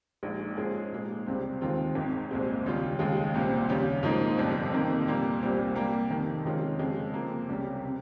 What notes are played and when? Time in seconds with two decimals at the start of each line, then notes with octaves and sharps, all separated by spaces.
0.23 A#1 A#2 G#3 D#4
0.57 G#2 F3 G#3 C#4 G#4
0.92 A#2 G#3 D#4
1.26 C#2 C3 G3 C4
1.61 D#2 D#3 G#3 C4 F4
1.95 G#1 G#2 D#3
2.31 C2 A#2 G#3 C4
2.64 D#2 C#3 G3 C#4 F4
2.99 D#2 C#3 G#3
3.34 C2 A#2 G3 C4
3.69 D#2 C#3 G3 C#4 G4
4.03 G#2 F3 A#3 D#4
4.37 G1 F2 C3 G3
4.72 F2 C3 D#3 A#3
5.07 A#2 G3 A#3
5.42 C2 A#2 G3 C4
5.75 C3 G3 A#3
6.10 F2 C3 D#3
6.45 C3 D#3 G#3 C#4 F4
6.79 F2 C#3 G#3
7.14 C3 F3 A#3
7.49 C#2 C3 G3 C#4 G4
7.85 C3